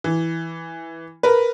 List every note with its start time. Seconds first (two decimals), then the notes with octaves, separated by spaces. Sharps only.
0.04 E3
1.23 A#4 B4